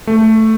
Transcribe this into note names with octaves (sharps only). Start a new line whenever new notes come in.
A3